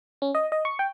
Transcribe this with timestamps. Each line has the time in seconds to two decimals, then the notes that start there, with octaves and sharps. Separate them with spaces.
0.22 C#4
0.35 D#5
0.52 D#5
0.65 C#6
0.79 G5